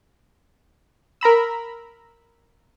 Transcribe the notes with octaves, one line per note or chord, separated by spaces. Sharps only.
A#4 A#5 B5 E6